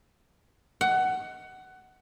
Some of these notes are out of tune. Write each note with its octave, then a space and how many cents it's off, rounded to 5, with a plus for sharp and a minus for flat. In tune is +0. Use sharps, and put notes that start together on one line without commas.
F#5 +15